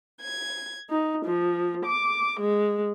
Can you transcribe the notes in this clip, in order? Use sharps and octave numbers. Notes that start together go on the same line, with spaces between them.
G#6
D#4
F3
D6
G#3